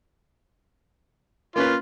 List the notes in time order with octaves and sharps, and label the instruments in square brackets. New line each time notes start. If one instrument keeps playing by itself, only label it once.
[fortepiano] A#3 C#4 B4 [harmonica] F4